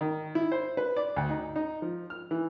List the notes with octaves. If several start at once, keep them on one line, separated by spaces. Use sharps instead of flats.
D#3
E4
C5
B4
D5
D2
D#4
D#4
F3
F6
E3